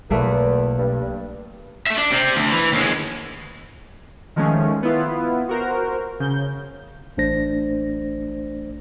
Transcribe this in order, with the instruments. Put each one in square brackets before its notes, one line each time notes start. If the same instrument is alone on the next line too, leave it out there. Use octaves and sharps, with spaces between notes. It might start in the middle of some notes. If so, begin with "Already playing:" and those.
[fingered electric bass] B1 B2 F#3 [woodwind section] E2 [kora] A3 A#3 B4
[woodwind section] G2
[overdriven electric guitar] A3 E5
D4
C3 C4
D2
E3
D#2 G#3
[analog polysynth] D#3 F3 G#3 A3 C#4
B3 E4 F4
F#4 A#4 C5
C#3 G6
[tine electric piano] A1 A3 D4 C5 A#6